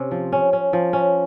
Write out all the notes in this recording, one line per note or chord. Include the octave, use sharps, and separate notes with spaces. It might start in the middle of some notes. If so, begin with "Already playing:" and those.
Already playing: C3 C#4
F3
C#4
C#4
F3
C#4